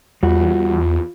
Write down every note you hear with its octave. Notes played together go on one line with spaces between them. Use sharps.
E2 G3 F4 F#4